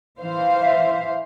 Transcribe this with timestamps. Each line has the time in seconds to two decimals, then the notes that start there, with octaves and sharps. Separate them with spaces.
0.19 E3 C5 F5
0.61 E5